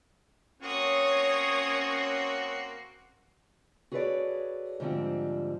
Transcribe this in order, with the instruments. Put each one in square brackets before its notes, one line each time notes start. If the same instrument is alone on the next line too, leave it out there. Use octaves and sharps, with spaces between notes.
[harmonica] A#3 C4 F#4 [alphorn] C#4 [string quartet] C#5 C#6 D#6
[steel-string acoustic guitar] F#4 G#4 A4 B4 C#5 D5
G#2 D3 F3 G3 C4